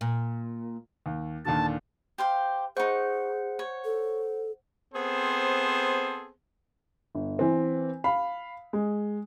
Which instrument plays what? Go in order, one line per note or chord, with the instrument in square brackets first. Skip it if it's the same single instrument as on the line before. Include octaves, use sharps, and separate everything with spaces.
[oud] A#2
[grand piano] D#2
[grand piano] D#2 A#2 D3 [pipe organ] A5
[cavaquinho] G4 C5 F5
[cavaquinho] D#4 C#6 [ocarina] G#4 [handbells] C5 F#5
[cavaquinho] C#5
[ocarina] A4
[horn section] B3 C4 G#4 A4 C5
[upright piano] G1
E3 C4
F5 B5
G#3